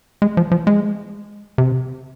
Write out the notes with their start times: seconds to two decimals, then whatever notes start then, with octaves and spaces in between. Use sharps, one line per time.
0.22 G#3
0.37 F3
0.51 F3
0.67 G#3
1.58 C3